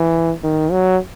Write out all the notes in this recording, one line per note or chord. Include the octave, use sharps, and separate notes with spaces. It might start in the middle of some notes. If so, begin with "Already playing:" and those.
Already playing: E3
D#3
F#3